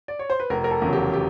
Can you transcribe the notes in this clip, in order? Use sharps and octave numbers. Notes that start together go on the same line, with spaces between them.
D5
C#5
C5
B4
F1 A#4
A#4
A4
E2 C#3 F#3
G4
G4